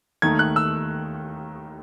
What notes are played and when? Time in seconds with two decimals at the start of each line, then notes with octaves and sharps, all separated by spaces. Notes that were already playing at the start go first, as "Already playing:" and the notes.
0.22 D#2 D#3 A3 D#4 G#6
0.39 F#6
0.56 E6